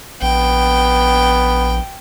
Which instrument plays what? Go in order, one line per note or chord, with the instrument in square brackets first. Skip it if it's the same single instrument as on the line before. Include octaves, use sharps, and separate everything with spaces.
[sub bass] A#1 [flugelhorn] B3 [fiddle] G5